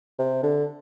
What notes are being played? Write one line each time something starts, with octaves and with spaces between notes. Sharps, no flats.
C3
D3